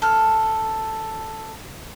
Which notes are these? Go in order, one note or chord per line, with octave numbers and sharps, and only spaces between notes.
A4 F6